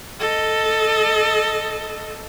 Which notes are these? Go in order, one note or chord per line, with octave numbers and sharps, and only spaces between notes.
A4 D#5